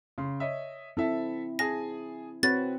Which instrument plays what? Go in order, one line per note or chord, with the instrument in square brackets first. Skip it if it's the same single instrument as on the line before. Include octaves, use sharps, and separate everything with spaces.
[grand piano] C#3 C6
C#5 D#5 E5
[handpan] C4 E4 [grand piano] A4 E5 A5
[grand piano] G#4 G#5 A5 [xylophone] A#6
[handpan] C4 [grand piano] F#4 B4 C#5 [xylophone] A6